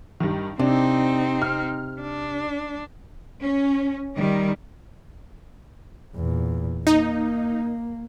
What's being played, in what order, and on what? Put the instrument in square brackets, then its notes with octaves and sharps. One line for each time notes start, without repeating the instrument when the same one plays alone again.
[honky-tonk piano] G2 D#3
[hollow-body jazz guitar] C3 [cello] C4 D#4 [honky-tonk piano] D4
[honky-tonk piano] F6
[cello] D4
[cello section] C#4
D#3 G3
[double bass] E2 A#2
[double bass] A#3 [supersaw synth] D#4